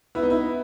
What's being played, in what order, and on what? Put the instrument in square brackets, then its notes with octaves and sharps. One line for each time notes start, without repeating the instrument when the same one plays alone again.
[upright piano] B3 [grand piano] E4
[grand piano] D#4
E4